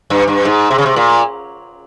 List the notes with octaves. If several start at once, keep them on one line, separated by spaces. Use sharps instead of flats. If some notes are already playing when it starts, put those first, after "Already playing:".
G2
G2
G#2
C3
C#3
C3
A#2